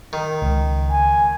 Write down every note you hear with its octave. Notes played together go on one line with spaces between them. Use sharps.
D#3
C#2
G#5